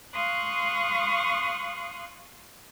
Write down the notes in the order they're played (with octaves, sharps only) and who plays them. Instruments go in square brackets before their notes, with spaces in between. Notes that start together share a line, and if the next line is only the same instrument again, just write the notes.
[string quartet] F5 C6 C#6 D#6 F#6